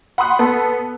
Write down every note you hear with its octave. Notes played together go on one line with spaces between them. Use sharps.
F#5 B5 C6 D#6 F#6
B3 A4